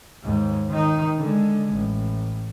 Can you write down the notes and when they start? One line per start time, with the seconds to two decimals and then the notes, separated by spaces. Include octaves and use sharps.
0.24 D#2 G#2
0.69 D#3 D#4
1.20 D3 G#3
1.73 A1